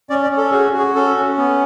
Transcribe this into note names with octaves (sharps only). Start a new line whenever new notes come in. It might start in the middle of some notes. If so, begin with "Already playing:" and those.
C#4 D5
D5
C#4
A4
F#4 G#4
F#4 G#4
C#4 A4
C#4
B3